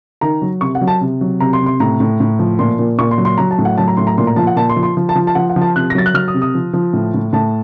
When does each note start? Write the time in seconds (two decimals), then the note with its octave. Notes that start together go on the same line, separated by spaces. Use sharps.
0.21 D#3 A#5
0.42 F#3
0.61 C3 C#6
0.75 F#5
0.81 F#3
0.87 A5
1.01 C3
1.21 F#3
1.40 C3 A#5
1.53 C6
1.61 C3
1.66 C6
1.80 A2 A#5
2.00 A2
2.20 A2
2.39 F3
2.59 A#2 C6
2.79 A#2
2.99 A#2 C#6
3.11 C6
3.18 F#3
3.25 C6
3.38 F#3 A#5
3.51 A5
3.59 A2
3.65 F#5
3.77 F#3 A5
3.88 A#5
3.97 A2 C6
4.07 A#5
4.18 A#2 C6
4.27 A#5
4.36 F3 A5
4.47 F#5
4.56 A#2 A5
4.69 C6
4.76 F3
4.83 C6
4.97 F3
5.09 A5
5.15 F3
5.27 A5
5.35 F3 F#5
5.50 F#5
5.56 F3
5.62 A5
5.76 C3 F#6
5.90 A#6
5.95 F#3 A6
6.06 F#6
6.14 F#3 F6
6.28 D#6
6.34 C3
6.42 D#6
6.55 F3
6.73 F3
6.93 A2
7.14 A2
7.33 A2 A5